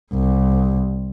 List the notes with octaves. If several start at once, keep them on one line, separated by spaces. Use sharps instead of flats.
C2